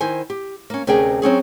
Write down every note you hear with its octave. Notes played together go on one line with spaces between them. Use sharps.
D#3 E4 C5 G#5
G4
A#3 C#4
D2 C3 C#4 G#4 A#4 G5
F#3 C4 C#4 G#4